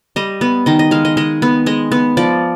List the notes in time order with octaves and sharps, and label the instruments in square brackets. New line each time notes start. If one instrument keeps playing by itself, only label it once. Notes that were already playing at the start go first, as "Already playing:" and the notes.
[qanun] G3 D#5
B3
D#3 D#5
D#5
G#3 F5
D#5
G#3 D#5
B3
G#3 D#5
B3
F3 D5